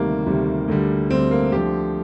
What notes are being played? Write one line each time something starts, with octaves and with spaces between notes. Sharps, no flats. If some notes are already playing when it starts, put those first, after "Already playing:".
Already playing: D2 C3 D#3 G3 A#3
D2 C3 D#3 G3
D2 D3 G3
D2 D3 G3 C4
A#3
D2 D3 F3 G4